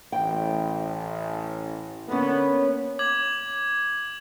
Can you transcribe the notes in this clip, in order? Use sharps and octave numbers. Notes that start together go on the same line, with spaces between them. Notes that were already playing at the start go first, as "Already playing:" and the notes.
A1 G5
D3 A#3 B3 C#4
D6 G#6 F#7